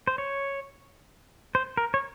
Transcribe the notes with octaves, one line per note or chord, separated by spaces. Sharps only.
C5
C#5
C5
A#4
C#5